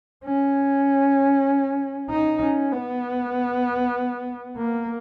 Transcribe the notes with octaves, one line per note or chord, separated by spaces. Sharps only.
C#4
D#4
C#4
B3
A#3